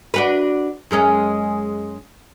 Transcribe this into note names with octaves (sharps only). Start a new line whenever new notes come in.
D4 F#4 B4
F#2 G#3 C#4